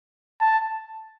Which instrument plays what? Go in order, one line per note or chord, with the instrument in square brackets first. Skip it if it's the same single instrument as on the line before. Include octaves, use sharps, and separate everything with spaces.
[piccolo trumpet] A5